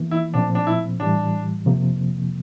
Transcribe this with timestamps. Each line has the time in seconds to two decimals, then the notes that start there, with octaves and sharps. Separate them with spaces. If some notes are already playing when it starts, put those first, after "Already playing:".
Already playing: E2 E3 A#3
0.11 E4
0.34 A#2 F3 A3 C4 D4
0.55 D4
0.67 E4
1.00 A2 E3 G3 D4
1.66 F2 C3 F3 A#3